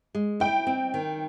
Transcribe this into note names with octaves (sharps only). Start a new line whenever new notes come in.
G#3
E4 G5
C4
D#3